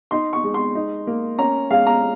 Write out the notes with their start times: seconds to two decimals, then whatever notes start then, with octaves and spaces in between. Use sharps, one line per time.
0.11 D#4 C6
0.33 C#6
0.44 G#3
0.54 C6
0.75 D#4
1.07 A#3
1.38 C#4 A#5
1.70 G#3 F5
1.87 A#5